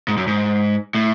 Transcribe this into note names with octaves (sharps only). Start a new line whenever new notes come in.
G#2
F#2
G#2
A2